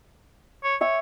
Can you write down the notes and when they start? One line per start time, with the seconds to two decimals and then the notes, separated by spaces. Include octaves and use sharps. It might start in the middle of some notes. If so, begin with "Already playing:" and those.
0.64 C#5
0.81 C#5 E5 G5